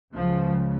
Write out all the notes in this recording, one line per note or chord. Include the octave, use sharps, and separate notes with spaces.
C#2 C#3 F3